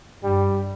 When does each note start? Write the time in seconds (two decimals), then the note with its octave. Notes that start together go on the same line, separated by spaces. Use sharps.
0.23 G2 G3